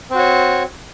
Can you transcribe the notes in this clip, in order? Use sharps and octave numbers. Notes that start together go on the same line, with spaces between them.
C4 F#4 C#5